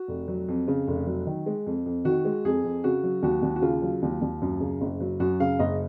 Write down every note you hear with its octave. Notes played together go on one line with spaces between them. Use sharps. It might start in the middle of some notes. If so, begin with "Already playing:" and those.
Already playing: F#4
F1
F#3
F2
C#3
F1
F#3
D#3
G#3
F2
F2
D#3 F#4
G#3
F2 G#4
F2
C#3 F#4
F#3
D#2 F#4
D#2
F#4
C#3 F4
F#3
D#2
D#2
F#2
C#3
F#1
F#3
F#2 F#4
C#3 F5
F#1 D#5